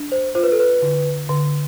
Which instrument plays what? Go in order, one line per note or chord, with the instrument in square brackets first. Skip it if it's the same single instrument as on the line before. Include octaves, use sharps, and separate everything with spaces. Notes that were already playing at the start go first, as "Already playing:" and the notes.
Already playing: [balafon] D4
[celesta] C5
[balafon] F4 [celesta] C5
[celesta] B4
A4
B4
[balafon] D3
D3